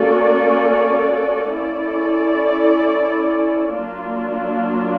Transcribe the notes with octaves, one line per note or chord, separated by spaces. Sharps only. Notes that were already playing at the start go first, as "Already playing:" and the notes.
Already playing: A#3 C#4 F#4 A4 D5
C#4 E4 A4 D5
F#3 A#3 D4 F4